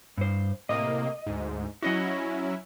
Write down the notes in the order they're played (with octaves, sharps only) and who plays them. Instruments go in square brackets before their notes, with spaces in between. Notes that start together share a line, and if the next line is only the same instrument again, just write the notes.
[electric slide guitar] G2 C5
[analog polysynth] A2 C3 A#3 [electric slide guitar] D#5
[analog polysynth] D2 G#2
[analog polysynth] F#3 C#4 E4 [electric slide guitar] F#4 D#5 F#5